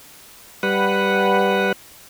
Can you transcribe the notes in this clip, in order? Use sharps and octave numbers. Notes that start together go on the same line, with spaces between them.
G3 B4 F#5